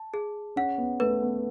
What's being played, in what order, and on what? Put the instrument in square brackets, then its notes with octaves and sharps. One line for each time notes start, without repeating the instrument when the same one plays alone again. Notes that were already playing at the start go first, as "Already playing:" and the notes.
Already playing: [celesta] A5
G#4
[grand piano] C#4 [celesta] F#5
[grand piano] B3
[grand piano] A3 [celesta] B4
[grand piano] B3